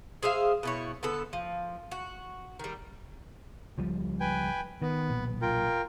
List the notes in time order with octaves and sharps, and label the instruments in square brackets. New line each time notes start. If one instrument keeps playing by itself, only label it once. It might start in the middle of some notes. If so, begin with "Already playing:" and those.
[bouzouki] G#4 C5 E5 F5
B2 E4 C#5
D3 B3 A4
F3
F#4
D#3 G3
[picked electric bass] C#2 F3 G3
[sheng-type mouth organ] B4 G5 G#5
[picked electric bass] D#3 [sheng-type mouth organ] B3
[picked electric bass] B1 A#2
[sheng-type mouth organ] F4 A#4 G5